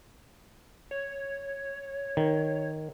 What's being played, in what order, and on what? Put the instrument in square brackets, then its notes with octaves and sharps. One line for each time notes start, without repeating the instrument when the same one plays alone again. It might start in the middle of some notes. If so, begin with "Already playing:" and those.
[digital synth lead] C#5
[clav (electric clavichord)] D#3